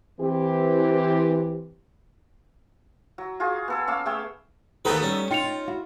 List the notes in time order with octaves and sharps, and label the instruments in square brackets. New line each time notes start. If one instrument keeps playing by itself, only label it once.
[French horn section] E3 C4 G4
[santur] F#3
F4 F#4 G#4
B3 A4 E6
C#4 F5 D6 E6
A3 G#4 G5 E6
[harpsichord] D#2 G4 B4 [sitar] A3 B3 D#4 [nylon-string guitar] G#4 A#4
[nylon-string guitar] G3 [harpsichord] C#4
[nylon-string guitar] D#4 [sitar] F4 [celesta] G5 C#7 F7
[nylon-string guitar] D#4
[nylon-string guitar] E4 F#4 [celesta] F5